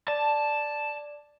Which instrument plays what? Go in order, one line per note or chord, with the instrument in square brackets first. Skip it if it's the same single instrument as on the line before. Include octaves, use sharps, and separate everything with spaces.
[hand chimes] D5 [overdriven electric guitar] A5